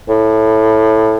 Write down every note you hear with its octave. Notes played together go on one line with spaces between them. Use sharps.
A2